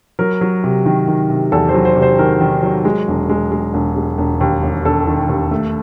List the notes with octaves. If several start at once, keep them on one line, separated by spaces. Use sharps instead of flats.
F#3 A#4
F#3
C3
D#3
D#3
C3
E2 A4
C5
F#3
C5
C3
C5
D#3 A#4
D#3
F#3
G#3
E1
G#3
G#3
E1
G#3
E1
D#2
E1
E1 A4
D#3
D#2
A3